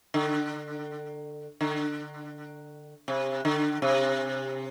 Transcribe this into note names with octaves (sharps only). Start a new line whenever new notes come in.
D3
D3
C3
D3
C3